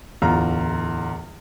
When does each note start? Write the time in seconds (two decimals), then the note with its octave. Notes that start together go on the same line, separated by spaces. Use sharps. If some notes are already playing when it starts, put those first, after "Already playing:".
0.22 D1 E2 F4 A#5 F6